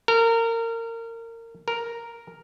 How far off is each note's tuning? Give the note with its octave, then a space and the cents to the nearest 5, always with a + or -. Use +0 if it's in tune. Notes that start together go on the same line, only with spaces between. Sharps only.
A#4 -25
A#4 +0